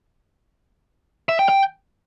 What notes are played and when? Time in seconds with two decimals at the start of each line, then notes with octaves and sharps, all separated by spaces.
1.29 E5
1.39 G5
1.49 G5